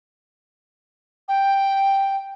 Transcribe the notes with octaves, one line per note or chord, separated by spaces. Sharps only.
G5